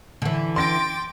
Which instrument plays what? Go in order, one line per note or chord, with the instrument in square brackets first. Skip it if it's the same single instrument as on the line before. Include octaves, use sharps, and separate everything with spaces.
[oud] D3 E3
[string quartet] G5 D6 A6 [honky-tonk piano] C6 A#6